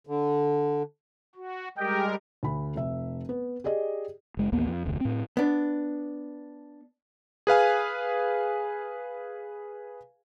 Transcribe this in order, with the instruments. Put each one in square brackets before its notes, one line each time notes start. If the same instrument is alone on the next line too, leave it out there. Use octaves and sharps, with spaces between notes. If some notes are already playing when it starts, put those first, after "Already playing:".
[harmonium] D3
[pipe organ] F#4
[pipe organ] G3 G#3 A#4 [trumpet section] G4 D#5 G5
[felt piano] D2 B5
F1 E5
B3
G4 G#4 D5 D#5
[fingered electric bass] F#1 G#3
A1 D#2 A#3 B3
F2
F1 D2
A2 C4
[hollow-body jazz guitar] B3 D4
[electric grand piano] G#4 B4 F5 G#5